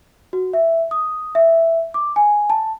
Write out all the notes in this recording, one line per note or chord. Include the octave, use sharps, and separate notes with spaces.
F#4
E5
D#6
E5
D6
G#5
A5